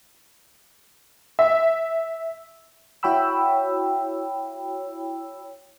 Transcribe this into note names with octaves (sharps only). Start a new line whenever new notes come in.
E5
E4 F#4 C#5 G5 B5 E6